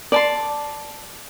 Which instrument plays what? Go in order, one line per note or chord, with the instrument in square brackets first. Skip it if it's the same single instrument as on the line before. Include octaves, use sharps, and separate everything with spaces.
[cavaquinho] D5 A5 C6